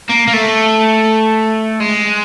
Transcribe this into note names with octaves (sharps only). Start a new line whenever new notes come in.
A#3
A#3
A3
G#3